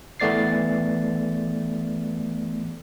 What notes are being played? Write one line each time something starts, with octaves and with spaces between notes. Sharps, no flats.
E3 A3 B3 D5 A6 C7